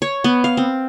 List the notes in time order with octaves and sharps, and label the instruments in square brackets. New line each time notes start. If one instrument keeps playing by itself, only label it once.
[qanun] C#5
B3
F5
C4